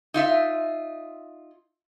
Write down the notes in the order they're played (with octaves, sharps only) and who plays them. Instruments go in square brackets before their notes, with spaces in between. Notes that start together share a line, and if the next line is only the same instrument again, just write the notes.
[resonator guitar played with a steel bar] D#4 F4 E5